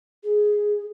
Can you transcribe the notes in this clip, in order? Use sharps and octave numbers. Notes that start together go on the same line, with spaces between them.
G#4